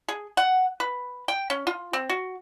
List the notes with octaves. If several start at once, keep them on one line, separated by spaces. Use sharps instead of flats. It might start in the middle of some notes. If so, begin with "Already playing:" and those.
G#4
F#5
B4
G5
C#4
F4
C4
F#4